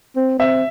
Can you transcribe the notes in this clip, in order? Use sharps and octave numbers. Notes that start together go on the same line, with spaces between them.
C4
C4 E5